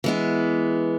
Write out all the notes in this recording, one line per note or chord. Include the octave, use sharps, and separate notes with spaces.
E3 G#3 B3